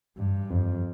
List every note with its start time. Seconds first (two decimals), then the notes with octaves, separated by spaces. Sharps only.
0.17 G2
0.50 F2